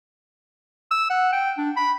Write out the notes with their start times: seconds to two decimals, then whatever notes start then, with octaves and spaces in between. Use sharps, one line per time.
0.91 E6
1.10 F#5
1.32 G5
1.58 D4
1.77 B5